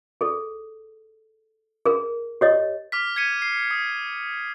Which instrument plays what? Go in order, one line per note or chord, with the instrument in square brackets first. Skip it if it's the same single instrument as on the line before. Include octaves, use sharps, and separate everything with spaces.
[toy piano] G#4 A4
G#4 A#4
G4 C#5 D#5
[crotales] D6 F6 B6
G#6 B6 C#7 D#7
C7
D#6